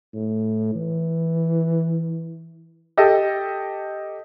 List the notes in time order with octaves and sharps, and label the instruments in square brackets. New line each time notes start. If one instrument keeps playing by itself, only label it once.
[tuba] A2
E3
[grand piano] G4 A4 D#5